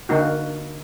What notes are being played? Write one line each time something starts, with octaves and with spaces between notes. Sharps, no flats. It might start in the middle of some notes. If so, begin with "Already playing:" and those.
D3 A#3 D#4 F#4